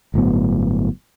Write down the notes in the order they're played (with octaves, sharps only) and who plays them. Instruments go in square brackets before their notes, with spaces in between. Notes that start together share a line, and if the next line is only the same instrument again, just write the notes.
[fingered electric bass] G1 A2 F#3 B3